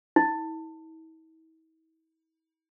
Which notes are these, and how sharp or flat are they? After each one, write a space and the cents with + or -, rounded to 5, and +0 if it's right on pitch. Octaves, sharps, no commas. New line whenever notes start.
E4 -45